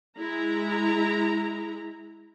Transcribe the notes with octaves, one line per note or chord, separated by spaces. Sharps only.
G#3 E4 A#5